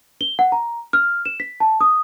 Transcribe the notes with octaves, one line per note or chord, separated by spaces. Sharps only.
G7
F#5
A#5
F6
E7
B6
A5
D#6